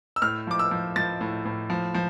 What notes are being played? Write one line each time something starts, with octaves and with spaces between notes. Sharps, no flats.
E6
A2 F6
F3 D6
E6
F3
F3 A6
A2
A2
F3
F3